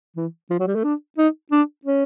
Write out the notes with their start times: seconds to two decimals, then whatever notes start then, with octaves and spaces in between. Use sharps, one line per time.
0.16 E3
0.50 F3
0.59 F#3
0.67 G3
0.76 A3
0.84 D4
1.18 D#4
1.52 D4
1.85 C#4